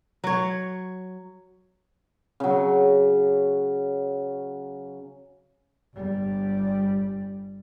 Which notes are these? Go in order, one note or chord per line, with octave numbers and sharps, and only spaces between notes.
F#3 C#5
C#3 F#3
G1 G3